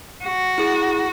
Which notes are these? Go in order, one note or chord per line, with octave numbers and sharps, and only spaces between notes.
F#4
E4 G#4